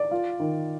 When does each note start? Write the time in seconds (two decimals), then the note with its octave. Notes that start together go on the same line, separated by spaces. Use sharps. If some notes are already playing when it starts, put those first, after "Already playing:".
Already playing: D5
0.11 F4
0.40 D#3